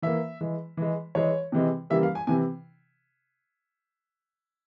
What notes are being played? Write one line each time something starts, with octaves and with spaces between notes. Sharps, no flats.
E3 A#3 E5
E3 G#3
E3 G#3
E3 G#3 C#5
C3 E3 G#3
C#3 E3 G3 A#3 E5
F5
G#5
C3 E3 G#5